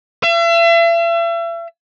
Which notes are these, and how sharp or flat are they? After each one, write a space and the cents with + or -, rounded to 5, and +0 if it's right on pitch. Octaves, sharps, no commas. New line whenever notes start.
E5 +40